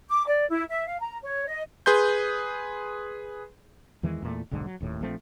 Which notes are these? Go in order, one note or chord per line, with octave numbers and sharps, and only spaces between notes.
D6
D5
E4
E5
F5
A#5
C#5
D#5
G#4 B4 C6 G6
E2 D#3 E3 G#3
E2 A#2 A3
D#1 B1 G#2 D3
F#3
D#1 D#2 A2
A#1 F3 A3 C4